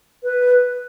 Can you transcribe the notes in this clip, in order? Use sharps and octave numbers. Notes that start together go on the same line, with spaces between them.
B4